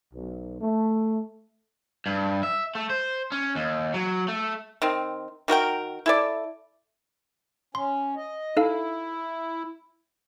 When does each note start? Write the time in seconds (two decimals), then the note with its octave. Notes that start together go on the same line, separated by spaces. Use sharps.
0.14 B1
0.61 A3
2.06 G2
2.43 E5
2.75 A3
2.90 C5
3.32 C#4
3.55 D#2
3.94 F#3
4.28 A3
4.82 D#3 C4
5.48 D#3 F#4 A#4 G5
6.06 E4 A4 D5
7.75 C#4 C6
8.16 D#5
8.57 D#4 E4 A4 F5